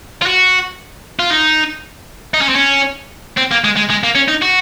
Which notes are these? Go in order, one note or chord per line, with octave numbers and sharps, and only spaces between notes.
F4
F#4
F4
D#4
D#4
C#4
C4
C#4
C4
A#3
G#3
G#3
G#3
A#3
C#4
D#4
F#4